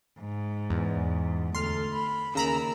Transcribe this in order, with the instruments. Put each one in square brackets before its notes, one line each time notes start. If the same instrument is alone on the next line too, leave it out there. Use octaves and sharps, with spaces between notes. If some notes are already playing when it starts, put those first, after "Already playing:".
[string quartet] G#2
[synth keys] E2
[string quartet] D2 A4 [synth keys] C6 F6
[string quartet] B5
[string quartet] D#2 A#4 E6 [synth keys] C#3 A#5 B5